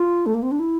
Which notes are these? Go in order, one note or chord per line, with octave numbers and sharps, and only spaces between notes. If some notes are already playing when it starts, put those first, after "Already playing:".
Already playing: F4
A3
A#3
C4
D4
E4